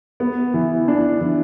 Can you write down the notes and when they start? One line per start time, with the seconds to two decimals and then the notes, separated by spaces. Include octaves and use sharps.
0.20 B3
0.54 E3
0.88 D4
1.21 E3